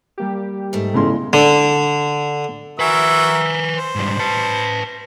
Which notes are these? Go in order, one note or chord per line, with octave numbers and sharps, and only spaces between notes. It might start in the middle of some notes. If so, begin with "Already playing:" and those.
G3 A#3 G4
G#2 A3
E2 C#3 G#3 C6
D3
F#4 A#4 B4 E5 G#5
C5
G#2 G3
B4 A5